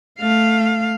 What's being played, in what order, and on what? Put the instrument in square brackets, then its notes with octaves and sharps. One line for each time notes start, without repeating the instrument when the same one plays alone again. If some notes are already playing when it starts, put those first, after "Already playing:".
[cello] A3 F5